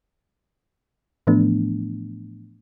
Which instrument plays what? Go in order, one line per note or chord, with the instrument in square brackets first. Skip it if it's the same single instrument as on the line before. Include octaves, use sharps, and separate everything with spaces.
[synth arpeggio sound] A2 E3 F3 A3 B3 D4